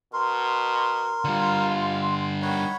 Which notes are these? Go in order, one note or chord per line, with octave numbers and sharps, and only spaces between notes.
B2 A#4 C6
D3 G3 F4
D#3 C#5 F#5 B5